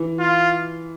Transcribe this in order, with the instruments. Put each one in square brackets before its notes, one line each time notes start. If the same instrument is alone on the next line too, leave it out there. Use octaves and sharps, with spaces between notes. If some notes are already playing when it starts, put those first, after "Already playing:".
Already playing: [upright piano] E3
[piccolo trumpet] F4